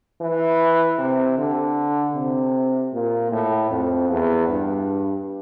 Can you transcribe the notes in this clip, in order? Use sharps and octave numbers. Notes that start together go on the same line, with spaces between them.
E3
C3
D3
C3
A#2
A2
F2
E2
G2